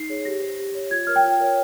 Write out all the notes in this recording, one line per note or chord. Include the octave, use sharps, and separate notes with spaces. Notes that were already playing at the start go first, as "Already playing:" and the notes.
Already playing: D#4 C7
G#4 C#5
G4 A#6
C5
G4
C#5
F4 G#6
A#4 C#5 F6
G5
F4
A#4 C#5